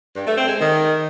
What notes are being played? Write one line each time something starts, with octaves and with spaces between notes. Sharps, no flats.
G2
A3
C4
G#3
D#3